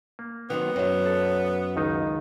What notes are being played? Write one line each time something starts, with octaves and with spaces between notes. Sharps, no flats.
A#3
D#3 F#3 B3 C4
F#2 F#3
A4
C#2 D#3 D#4